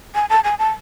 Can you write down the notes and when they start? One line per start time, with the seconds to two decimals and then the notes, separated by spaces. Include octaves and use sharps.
0.15 G#5
0.30 A5
0.44 G#5
0.59 A5